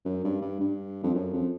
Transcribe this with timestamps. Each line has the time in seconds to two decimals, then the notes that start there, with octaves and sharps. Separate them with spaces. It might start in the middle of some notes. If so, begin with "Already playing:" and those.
0.05 F#2
0.24 G2
0.42 G2
0.61 G2
1.03 F2
1.14 F#2
1.33 F2